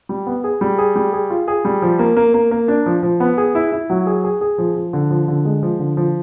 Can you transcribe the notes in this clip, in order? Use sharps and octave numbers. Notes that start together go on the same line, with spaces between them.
G3
B3
G#4
G3
G#4
G3
G#4
F4
G#4
G3
F3
A#3
A#3
A#3
A#3
D4
F3
F3
B3
G#4
E4
E4
F#3
G#4
G#4
G#4
F3
F3
D3
F3
D3
G#3
F3
D3
F3